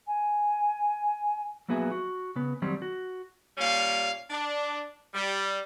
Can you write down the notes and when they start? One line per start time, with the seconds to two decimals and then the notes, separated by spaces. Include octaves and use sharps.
0.07 G#5
1.68 F#3 A#3 B3 F#4 G#4 E5
1.91 F#4
2.36 C#3 B3
2.62 D#3 F#3 G3 C4
2.82 F#4
3.58 A#2 G3 C#4 F5
4.30 D4
5.14 G3